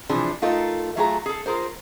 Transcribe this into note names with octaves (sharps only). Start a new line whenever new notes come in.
C3 E3 F3 D4 G#4
A3 D#4 F4 A4 A#4
F#3 A3 F4 G#4 A4 A#5
G#4 A4
F4 G#4 A#4 C5